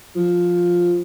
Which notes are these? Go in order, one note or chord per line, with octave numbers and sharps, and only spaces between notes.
F3